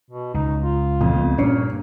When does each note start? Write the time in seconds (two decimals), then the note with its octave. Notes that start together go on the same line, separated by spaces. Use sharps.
0.11 B2
0.34 C#2 D#4
0.63 F4
1.01 F2 A#2 E3 F3
1.16 C2 A3 B3
1.38 G2 A#2 A#3 C#4